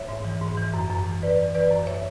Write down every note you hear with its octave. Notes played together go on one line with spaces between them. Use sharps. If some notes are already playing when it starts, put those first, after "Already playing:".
Already playing: C#5 E5
G#2
E3
G#2
E3
F#2
F#2
E3
E3 B4 D5
E3
E3 B4 D5
F#2
C#5 E5